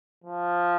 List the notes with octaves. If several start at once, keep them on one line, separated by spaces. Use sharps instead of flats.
F3